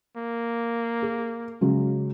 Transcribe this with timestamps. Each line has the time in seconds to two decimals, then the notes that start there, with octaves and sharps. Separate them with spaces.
0.17 A#3
1.02 G#4
1.61 C#3 F#3 G#3